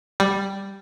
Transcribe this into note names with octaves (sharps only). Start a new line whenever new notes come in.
G3